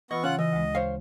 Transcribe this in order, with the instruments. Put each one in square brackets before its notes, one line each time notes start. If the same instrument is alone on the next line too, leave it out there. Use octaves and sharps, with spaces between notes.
[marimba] E3 F4 E6 [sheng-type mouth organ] B3 C#6 [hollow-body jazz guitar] D#5
[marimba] C#3 [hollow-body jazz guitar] C#4 [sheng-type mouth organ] F4 F#5 F#6
[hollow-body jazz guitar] E3 [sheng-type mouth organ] D#5
[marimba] D2 G#3
[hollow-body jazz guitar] C5 C#5 F5